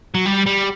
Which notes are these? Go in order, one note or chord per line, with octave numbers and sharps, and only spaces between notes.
F#3
G3
G3